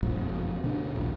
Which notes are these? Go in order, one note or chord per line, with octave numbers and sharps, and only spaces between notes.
A#1 G2 A#2
F#1 F2 B2
D2 B2 D4
D#1 A#1